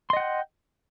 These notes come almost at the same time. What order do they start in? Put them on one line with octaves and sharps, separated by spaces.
C6 D#5 F#5 G5